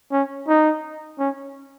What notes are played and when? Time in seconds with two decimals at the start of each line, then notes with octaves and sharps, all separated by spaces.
0.12 C#4
0.48 D#4
1.19 C#4